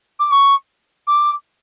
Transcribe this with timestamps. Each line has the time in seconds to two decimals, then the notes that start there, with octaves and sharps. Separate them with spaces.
0.19 D6
0.31 C#6
1.07 D6